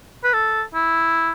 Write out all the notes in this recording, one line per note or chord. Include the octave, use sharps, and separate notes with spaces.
B4
A4
E4